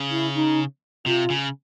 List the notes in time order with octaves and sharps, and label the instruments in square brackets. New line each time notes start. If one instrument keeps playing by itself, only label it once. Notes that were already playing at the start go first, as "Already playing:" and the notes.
Already playing: [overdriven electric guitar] C#3
[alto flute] E4
D#4
[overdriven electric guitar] C3 [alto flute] F4
[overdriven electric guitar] C#3